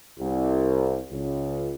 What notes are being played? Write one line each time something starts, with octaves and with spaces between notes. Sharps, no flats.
C2
C#2